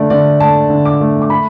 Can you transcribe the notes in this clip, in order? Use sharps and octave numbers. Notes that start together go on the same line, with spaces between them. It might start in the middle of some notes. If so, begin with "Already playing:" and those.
Already playing: D3 A3 D5
D3 D5
A3 A5
D3
D6
A3
D6
A3 B5